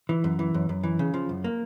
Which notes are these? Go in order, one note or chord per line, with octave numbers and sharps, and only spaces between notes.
E3
F#2
E3
F#2
F#2
E3
C#3
F3
F#2
A#3